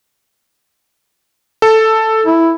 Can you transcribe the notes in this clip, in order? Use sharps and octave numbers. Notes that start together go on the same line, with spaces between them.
A4
E4